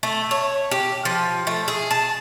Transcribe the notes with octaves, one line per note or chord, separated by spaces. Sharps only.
A3
C#5
G4
F3
A3
G#4
A5